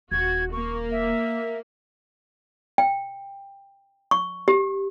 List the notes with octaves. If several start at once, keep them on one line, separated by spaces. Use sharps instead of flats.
D#1 F#4 G#6
A#3 C#6
E5
G5
C#6
G4